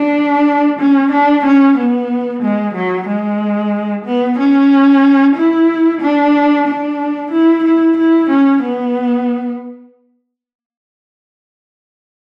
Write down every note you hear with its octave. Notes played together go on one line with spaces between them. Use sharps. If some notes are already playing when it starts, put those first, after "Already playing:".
Already playing: D4
C#4
D4
C#4
B3
G#3
F#3
G#3
B3
C#4
E4
D4
D4
E4
E4
E4
C#4
B3